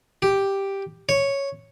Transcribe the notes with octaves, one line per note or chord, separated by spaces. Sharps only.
G4
C#5